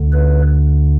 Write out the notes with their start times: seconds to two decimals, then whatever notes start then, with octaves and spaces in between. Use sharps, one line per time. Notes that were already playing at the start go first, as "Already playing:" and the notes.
Already playing: D2 D3
0.12 B4